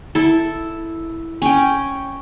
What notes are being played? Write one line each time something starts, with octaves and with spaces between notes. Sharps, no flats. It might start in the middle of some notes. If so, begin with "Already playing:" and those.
E4 A4
C#4 G5